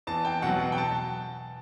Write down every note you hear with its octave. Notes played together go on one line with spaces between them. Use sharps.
E2 A5
G5
B2 F#3 F#5
F#5
G5
A5